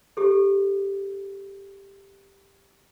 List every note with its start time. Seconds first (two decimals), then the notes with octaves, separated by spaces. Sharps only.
0.17 G4 A4